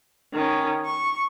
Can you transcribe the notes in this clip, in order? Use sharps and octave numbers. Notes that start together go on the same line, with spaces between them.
D#3 C#4
C#6